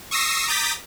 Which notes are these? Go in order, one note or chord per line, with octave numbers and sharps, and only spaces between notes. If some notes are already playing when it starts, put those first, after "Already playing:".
C#6 D#6 E6 A#6 C7
A#5 D6 D#6 G6 A6 B6